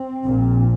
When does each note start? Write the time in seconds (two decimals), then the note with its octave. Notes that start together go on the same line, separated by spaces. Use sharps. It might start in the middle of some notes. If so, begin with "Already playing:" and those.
Already playing: C4
0.22 A#1 A#2